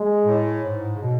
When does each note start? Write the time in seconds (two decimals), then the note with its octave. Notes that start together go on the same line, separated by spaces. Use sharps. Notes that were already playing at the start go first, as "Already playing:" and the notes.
Already playing: G#3
0.25 A2
0.63 G#2
0.95 C#3
1.01 B2